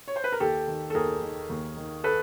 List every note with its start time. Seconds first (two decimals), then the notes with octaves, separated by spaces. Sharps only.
0.08 C#5
0.16 C5
0.24 B4
0.32 A#4
0.40 D#2 G4 A4
0.67 D#3
0.90 A4
0.95 D#2 G#4 A#4
1.22 D#3
1.50 D#2
1.77 D#3
2.04 A4 B4